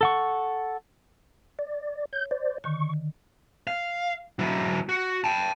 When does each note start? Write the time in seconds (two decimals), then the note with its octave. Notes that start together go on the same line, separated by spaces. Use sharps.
0.01 A4 F#5 C#6
1.59 D5
2.13 C#5 G6
2.31 C5 D5
2.64 D3 D#3 C#6
3.67 F5
4.39 F#3 E4
4.89 F#4
5.24 G5 A5